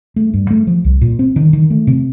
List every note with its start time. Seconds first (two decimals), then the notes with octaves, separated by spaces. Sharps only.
0.16 A3
0.34 G2
0.50 A3
0.67 F3
0.84 C2
1.01 A#2
1.19 C4
1.36 D#3
1.53 D#3
1.70 A3
1.87 C3